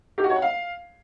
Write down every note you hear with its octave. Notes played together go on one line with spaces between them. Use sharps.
G4
F#4
C#5
F#5
F5